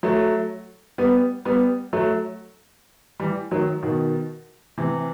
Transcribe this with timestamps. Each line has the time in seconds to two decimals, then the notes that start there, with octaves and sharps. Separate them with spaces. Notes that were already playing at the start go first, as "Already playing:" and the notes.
0.03 F#3 A3
0.98 G3 B3
1.45 G3 B3
1.93 F#3 A3
3.20 E3 G3
3.51 D#3 F#3
3.82 B2 D#3
4.78 C3 E3